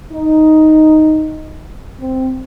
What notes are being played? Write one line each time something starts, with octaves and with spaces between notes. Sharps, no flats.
D#4
C4